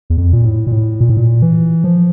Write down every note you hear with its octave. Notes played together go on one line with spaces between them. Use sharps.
E2
F2
A#2
A2
A#2
A2
A#2
A2
A#2
E3
F3